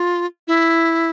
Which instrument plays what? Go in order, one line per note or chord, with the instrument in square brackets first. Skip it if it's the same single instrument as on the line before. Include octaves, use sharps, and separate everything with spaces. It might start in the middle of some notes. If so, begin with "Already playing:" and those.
Already playing: [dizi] F4
E4